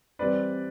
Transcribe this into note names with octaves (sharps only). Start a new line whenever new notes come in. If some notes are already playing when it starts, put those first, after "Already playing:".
E3 G3 C4 B4 D5